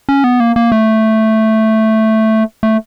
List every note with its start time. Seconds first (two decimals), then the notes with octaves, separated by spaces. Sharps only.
0.09 C#4
0.24 B3
0.40 A#3
0.56 A#3
0.72 A3
2.63 A3